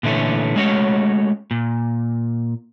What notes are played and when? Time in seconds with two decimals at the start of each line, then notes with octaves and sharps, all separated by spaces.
0.03 A#2 D3 E3 A3 C#4
0.56 G#3 A3 C#4 F#4 C#5
1.51 A#2